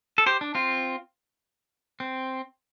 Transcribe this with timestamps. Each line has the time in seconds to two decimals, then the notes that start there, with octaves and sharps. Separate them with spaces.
0.18 A4
0.26 G4 C5
0.41 D4
0.55 C4 F4
2.00 C4